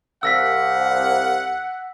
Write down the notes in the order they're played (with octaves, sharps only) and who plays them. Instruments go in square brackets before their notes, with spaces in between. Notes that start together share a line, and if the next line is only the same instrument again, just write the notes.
[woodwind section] C2 [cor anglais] F5 [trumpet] F#5 [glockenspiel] E6 A#6 B6